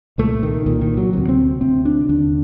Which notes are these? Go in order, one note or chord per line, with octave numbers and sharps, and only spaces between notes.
C2 A#2 A3
D#3
C2 A#2 D#3
D#3
F#3
D2 C3 F#3
C4
D2 C3 C4
D4
D#2 D3 D4